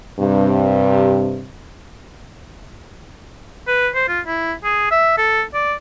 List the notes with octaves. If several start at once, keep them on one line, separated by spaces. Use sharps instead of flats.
G2 C3
B4
C5
F4
E4
G#4
E5
A4
D5